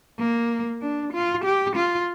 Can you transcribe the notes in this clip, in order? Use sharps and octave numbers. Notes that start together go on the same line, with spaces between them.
A#3
D4
F4
G4
F4